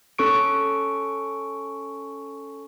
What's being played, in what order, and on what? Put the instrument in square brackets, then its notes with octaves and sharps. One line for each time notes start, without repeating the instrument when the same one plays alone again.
[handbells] C#4 A4 C#6 D7